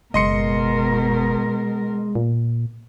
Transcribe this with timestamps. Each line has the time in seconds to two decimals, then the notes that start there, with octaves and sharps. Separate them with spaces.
0.14 F#1 B2 G#3 A#4 D#5 C6 C#7
2.15 A#2